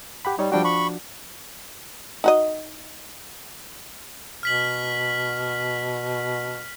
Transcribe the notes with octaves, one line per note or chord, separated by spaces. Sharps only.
G4 F#5 B5
G3 D#4 C#5
F3 G3 D4 F#4 G5
B5 C#6
D#4 F#4 D#5
B2 F6 B6 F#7